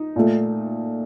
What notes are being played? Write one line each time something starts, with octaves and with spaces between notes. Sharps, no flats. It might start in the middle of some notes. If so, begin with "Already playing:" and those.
Already playing: D#4
A#2 A3